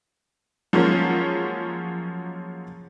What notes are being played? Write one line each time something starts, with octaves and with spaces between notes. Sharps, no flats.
F3 F#3 G#3 A#3 C#4